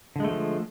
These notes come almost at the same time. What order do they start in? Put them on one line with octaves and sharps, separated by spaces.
D3 G#3 A3 F3